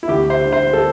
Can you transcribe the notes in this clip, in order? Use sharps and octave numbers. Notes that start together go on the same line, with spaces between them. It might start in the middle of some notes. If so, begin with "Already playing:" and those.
E4
D2 G4
C5
D3
C5
A4